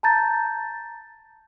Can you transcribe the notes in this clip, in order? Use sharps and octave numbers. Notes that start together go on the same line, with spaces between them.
A5 A#5 G6 A6